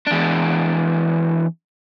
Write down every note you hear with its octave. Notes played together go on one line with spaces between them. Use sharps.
E2 D4